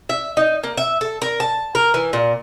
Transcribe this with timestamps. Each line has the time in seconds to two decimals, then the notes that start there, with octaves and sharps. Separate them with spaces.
0.09 E5
0.37 D#4
0.64 A#3
0.77 E5
1.01 A4
1.22 A#4
1.40 A5
1.75 A#4
1.94 E3
2.13 A#2